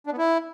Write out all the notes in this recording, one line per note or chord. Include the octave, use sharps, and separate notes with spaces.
D4
B3
E4